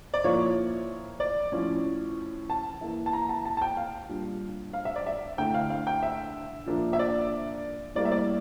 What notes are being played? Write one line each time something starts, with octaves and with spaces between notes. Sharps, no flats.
D5
A#2 F3 A#3 E4 C#5
D5
A2 F3 C#4
A5
E3 A#3 E4
A5
A#5
A5
A5
A5
G5
F5
A#2 G3 D4
F5
E5
D5
E5
D3 A3 E4 G5
F5
F5
G5
E5
A#2 F3 A#3 D4
E5
D5
A2 G3 A#3 D5
E5
D5